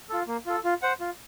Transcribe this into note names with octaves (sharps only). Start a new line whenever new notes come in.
F4 A4
A#3
F4 A4
F4
C5 F#5
F4